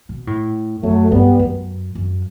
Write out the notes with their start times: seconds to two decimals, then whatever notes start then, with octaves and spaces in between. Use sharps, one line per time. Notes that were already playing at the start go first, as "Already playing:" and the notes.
0.09 B2
0.27 A2
0.83 F#2 F#3 A3
1.11 G2 G3 B3
1.39 F#2
1.95 F#2